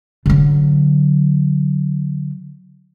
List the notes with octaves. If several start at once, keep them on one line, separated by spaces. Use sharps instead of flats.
D3 F#3